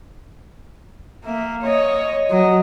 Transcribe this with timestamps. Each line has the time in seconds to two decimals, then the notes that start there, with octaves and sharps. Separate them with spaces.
1.24 A#3 E5
1.62 C#5 D#5
2.30 F#3 D#5